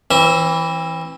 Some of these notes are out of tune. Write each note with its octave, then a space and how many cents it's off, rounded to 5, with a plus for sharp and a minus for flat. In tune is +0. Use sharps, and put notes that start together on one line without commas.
E3 +0 C4 +40 E5 -20